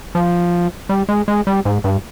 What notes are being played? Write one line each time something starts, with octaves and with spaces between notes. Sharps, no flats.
F3
G3
G#3
G#3
G3
G#2
G2